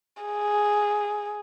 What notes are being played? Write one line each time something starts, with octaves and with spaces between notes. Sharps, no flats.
G#4